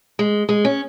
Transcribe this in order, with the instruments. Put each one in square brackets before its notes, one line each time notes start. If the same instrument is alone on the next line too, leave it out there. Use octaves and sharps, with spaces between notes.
[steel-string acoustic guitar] G#3
G#3
C#4